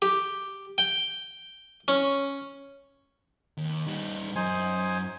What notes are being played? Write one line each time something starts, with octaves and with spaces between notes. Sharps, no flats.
G4
G5
C#4
D#2
G3 D#4
F#2 D#4 C5 G#5